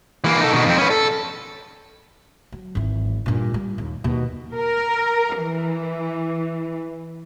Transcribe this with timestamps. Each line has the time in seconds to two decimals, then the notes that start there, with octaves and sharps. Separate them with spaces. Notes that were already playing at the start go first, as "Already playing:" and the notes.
0.24 E3 A#3
0.41 D#4 A4
0.52 B2 D#3
0.65 F2 C4
0.78 C#4 B4
0.90 A4
2.52 F#3
2.75 G#1 E3
3.26 G2 A#2
3.54 G3
3.78 D#2
4.04 D#2 B2
4.56 A#4
5.40 E3